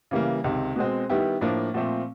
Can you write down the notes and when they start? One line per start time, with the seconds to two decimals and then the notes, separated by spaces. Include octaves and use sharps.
0.11 C#3 E3 G3 A#3
0.44 C#2 C3 D#3
0.76 B2 G#3 C4
1.10 D#3 G3 B3 E4 G4
1.41 A2 F3 A#3 D4
1.74 A#2 F3 A3 C4